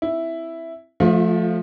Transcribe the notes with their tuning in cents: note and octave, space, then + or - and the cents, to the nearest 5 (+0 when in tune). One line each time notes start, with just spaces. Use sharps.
C4 +0 E4 +0
F3 +0 A3 -10 F4 +35